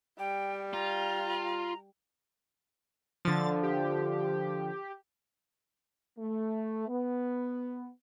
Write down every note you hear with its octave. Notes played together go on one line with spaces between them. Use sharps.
G3 G5
F4 A#5
D3 F3 A6
G4
A3
B3